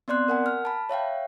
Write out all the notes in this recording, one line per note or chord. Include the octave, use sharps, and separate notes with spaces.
B3 C4 D5 C6 F#6
A#4 F#5 G#5
F6
A5 B5
C#5 E5 F5 G5